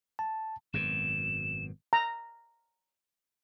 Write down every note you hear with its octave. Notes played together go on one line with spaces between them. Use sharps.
A5
G#1 F#2 B2 E7
A#5